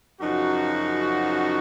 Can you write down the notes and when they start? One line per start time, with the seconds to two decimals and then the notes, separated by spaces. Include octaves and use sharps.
0.20 F#2 C#3 F3 D#4 F#4